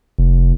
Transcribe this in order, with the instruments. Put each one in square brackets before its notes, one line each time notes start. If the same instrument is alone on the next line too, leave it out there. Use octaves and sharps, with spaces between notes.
[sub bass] F1